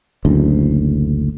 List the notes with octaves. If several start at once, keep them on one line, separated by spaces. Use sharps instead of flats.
F#1 D2